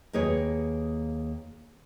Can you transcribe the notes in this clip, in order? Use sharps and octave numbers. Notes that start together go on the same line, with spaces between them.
D#2 A#3 G#4 B4 C#5